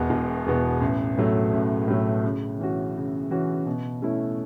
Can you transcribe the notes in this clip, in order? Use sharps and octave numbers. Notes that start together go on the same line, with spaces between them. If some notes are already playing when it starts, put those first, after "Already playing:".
Already playing: E1 E2 B2 B3
E1
E2 B2 B3
A1
A2 F#3 A3
A1
A2 F#3 A3
C#3
E3 C#4 F#4
C#3
E3 C#4 F#4
B2
A3 C#4 E4